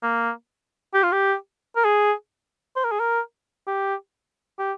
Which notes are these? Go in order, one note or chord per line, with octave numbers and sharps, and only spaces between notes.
A#3
G4
F4
G4
A#4
G#4
C5
A#4
G#4
A#4
G4
G4